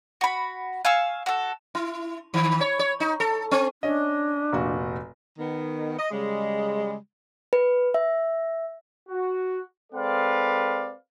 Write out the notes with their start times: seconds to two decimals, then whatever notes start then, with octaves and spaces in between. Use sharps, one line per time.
0.21 F#4 B5
0.85 F5 G#5 C#6 E6
1.26 F#4 A4
1.75 E4
2.34 D#3
2.61 C#5
2.79 C#5
3.00 D#4
3.20 A4
3.51 C4
3.83 C#4 D4 D#5
4.53 F1 A#2 F#4
5.38 D#3 B3
5.98 D#5
6.11 C#3 G3 G#3
7.53 B4
7.94 E5
9.09 F#4
9.92 G#3 C4 A4 B4 D5 F5